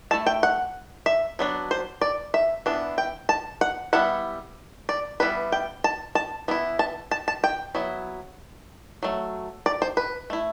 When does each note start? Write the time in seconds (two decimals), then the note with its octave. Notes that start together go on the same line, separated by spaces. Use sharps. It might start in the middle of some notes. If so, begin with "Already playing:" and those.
0.11 A3 E4 A5
0.26 G5
0.43 F#5
1.06 E5
1.39 F#3 B3 D4
1.71 C5
2.01 D5
2.34 E5
2.66 E3 B3 D4
2.98 G5
3.29 A5
3.61 F#5
3.93 G3 B3 E4 F#5
4.89 D5
5.20 E3 G3 B3 E4 B4
5.52 G5
5.84 A5
6.15 A5
6.48 E3 B3 E4
6.79 A5
7.11 A5
7.28 A5
7.44 G5
7.75 F#3 B3 E4
9.03 F#3 A3
9.66 D5
9.82 C5
9.97 B4
10.30 A3 E4